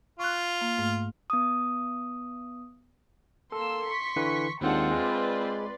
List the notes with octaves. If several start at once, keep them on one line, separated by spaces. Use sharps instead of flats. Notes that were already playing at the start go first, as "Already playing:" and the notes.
F4 C#6 F#6
A#3
G#2 A3
B3 D#6
A#3 A4 C6 E6
C#6 B6
D3 E3 B4
D#2 D#3 G#3 C4 D4 F4 F#5 G5
G#3 B4 D5 C6